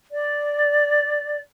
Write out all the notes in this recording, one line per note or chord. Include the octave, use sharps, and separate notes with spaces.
D5